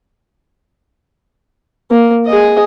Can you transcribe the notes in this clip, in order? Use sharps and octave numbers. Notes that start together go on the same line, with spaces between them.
A#3
G#4 D#5